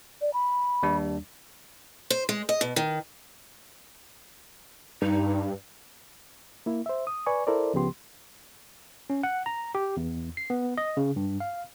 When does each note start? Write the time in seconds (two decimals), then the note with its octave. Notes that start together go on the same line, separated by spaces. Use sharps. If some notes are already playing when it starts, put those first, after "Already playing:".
0.21 D5
0.33 B5
0.83 D#2 G3 D4
2.10 C5
2.29 G#3
2.49 D#5
2.61 B2
2.76 D#3
5.02 G2 D#4
6.66 A#3 E4
6.86 C5 E5
7.07 D#6
7.26 B4 D5 G#5 C#6
7.47 E4 A4 A#4 C5 D5
7.73 C#2 C#3 F3 B3 G4 C6
9.10 C#4
9.23 F#5
9.46 A#5
9.75 G4
9.97 E2
10.37 C7
10.50 B3
10.78 D#5
10.97 C#3
11.16 G2
11.40 F5